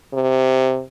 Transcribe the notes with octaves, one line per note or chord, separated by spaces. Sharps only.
C3